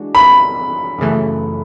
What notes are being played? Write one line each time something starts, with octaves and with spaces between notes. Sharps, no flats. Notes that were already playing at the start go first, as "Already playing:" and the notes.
Already playing: E3 G#3 D4 F#4
B5
F#2 C#3 E3 A3